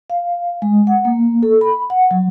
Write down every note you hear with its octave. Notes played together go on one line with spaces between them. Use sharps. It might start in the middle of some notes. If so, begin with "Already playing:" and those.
F5
G#3
F#5
A#3
A4
B5
F#5
F#3